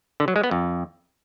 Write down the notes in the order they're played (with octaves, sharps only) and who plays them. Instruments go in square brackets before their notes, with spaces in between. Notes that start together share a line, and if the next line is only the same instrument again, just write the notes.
[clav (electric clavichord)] D3
F#3
G#3
B3
F2